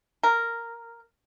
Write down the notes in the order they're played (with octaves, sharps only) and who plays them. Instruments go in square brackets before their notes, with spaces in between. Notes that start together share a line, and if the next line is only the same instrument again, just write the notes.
[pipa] A#4